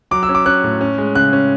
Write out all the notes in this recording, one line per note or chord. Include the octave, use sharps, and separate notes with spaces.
F#3 D6
E6
C#4
D6
C#4 F#6
A2
C#4
G#3
C#3 F#6
C#4